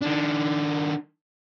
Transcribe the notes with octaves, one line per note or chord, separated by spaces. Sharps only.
D#3 D4